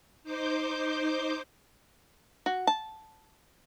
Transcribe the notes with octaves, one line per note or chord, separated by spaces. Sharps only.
D#4 C5 D6 G6
F#4
A5